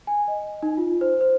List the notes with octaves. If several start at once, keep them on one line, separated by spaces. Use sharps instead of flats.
G#5
D#5
D#4
F4
C5
C5